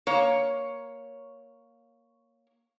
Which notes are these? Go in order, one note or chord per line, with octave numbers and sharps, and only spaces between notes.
A#3 C#5